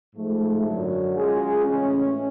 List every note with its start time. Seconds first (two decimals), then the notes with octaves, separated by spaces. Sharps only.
0.15 G#2 F3 A3
0.65 F#2 D3 F#3
1.16 G#3 C#4 F4 G#4
1.65 A2 E3 G#3 C#4